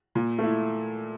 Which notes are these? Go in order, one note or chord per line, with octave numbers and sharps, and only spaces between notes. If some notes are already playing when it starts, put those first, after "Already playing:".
A#2
A3 E4